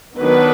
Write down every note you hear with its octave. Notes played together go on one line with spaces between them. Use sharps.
D#3 F#3 B3 D4 B4